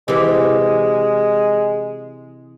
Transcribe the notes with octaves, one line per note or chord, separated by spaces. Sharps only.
C3 E3 G#3